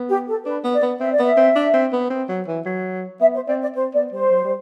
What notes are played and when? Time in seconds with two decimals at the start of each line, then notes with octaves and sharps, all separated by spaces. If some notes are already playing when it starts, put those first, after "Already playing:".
Already playing: B3
0.09 G4
0.28 A4
0.46 D4 B4
0.64 B3
0.73 D5
0.82 B3
1.00 C4 E5
1.12 D5
1.19 B3 E5
1.37 C4
1.55 D4
1.74 C4
1.93 B3
2.10 C4
2.29 F#3
2.47 E3
2.66 F#3
3.20 B3 E5
3.35 C5
3.48 C4 D5
3.62 D5
3.75 C4 C5
3.94 B3 D5
4.12 G3 C5
4.31 F#3
4.44 G3